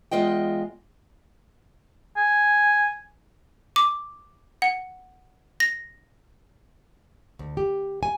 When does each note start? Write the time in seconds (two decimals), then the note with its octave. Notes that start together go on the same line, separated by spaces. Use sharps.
0.11 E2 G#3 F4 D#5 G5
2.17 G#5
3.76 D6
4.62 F#5
5.60 A#6
7.39 D2
7.57 G4
8.03 G#5